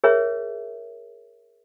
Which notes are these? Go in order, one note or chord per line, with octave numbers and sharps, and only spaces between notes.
G#4 A#4 C#5 E5